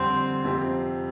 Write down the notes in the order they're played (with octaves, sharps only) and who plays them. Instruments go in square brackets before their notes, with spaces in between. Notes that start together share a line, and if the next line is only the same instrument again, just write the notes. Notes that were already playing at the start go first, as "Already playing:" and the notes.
Already playing: [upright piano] F2 D3 G3 [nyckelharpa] C4
[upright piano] F2 C3 F3 C4 G4